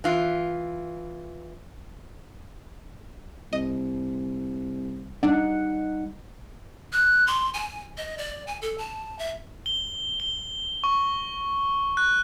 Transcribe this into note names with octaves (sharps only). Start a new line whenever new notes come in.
E3 F4
C2 D#5
G3 D4 D#4 F#5
F#6
C6
G#5
D#5
D5
G#5
A4
A5
E5
G7
G7
C#6
F#6